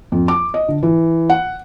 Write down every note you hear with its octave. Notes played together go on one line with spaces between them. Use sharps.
F2
D6
D#5
D3
E3
F#5